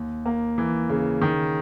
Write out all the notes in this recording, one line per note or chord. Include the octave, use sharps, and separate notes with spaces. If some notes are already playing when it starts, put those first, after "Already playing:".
Already playing: D#2
A#3
E3
C#3
D#3